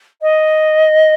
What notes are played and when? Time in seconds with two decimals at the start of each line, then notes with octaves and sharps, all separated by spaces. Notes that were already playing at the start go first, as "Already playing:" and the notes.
0.21 D#5